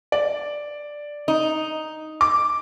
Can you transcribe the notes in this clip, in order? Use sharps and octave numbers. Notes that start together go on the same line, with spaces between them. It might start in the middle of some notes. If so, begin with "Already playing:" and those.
D5
D#4
D6